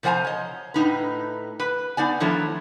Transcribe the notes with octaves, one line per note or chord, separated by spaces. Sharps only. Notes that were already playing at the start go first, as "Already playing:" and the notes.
C3 F3 C5 F#5 G#5 A#5
C#5 D#5
A2 D#4 B4
B4
B3 D#4 D5 G#5
D#3 F3 A3 D4 E4 C#5